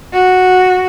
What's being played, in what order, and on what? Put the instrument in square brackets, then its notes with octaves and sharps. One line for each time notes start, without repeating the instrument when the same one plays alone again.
[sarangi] F#4